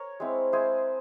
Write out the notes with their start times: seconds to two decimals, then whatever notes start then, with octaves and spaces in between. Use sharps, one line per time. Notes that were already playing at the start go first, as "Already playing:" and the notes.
Already playing: A#4 C#5
0.20 G#3 C4 E4
0.52 G#3 E4 G#4 C5